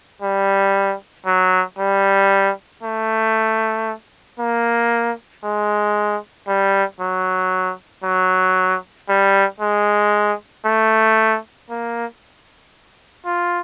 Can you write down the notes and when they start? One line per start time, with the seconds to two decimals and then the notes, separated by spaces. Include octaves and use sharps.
0.22 G3
1.26 F#3
1.79 G3
2.83 A3
4.39 A#3
5.44 G#3
6.48 G3
7.00 F#3
8.04 F#3
9.09 G3
9.60 G#3
10.66 A3
11.70 A#3
13.25 F4